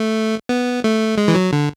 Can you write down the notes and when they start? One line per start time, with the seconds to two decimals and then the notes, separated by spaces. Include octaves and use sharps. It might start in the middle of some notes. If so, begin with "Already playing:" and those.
Already playing: A3
0.49 B3
0.84 A3
1.18 G#3
1.28 E3
1.35 F#3
1.53 D3